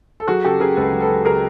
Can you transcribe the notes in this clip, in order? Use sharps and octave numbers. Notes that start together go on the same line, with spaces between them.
A4
F#3 F#4 G#4
C#3 G4 A4
C#3 G#4 A#4
C#2 A4 B4
F#3
A4 B4
F#3
C#3 G#4 A#4